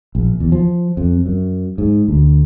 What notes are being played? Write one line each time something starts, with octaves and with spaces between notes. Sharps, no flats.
A#1
E2
F3
F2
F#2
G#2
D2